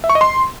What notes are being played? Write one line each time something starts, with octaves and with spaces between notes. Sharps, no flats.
E5
C#6
D#5
C6